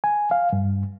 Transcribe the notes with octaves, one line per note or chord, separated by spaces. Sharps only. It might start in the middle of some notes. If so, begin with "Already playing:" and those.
G#5
F5
G2